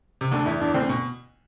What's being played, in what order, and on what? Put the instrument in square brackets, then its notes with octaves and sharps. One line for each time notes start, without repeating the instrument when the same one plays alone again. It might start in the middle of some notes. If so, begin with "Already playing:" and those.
[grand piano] C3
[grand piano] D2 D3 [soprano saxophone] D4
[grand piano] E2 E3 [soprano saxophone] E4
[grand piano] E2 E3 [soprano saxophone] D4
[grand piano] D2 D3 [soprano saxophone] C4
[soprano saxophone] C4
[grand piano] B2